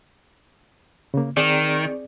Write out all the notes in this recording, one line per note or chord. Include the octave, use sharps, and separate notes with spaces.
C#3 A#3
D#3 C4 G#4 D5